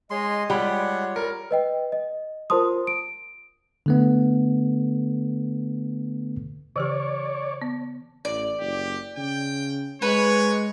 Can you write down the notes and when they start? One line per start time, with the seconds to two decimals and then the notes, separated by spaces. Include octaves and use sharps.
0.10 G#3 C#5 D#5 C6
0.50 G3 G#3 F4 C#5 F#5 G5 B5
1.16 G3 A#4
1.51 B4 D#5 G5
1.92 D#5
2.50 F4 A#4 C5 A5 C6 D#6
2.87 D7
3.86 D3 A3 B3
6.76 C#3 E3 G4 C#5 D5
7.62 B3
8.25 A1 D5
8.60 F#1 G4
9.17 C#3 G5
10.02 G#3 B4 C#5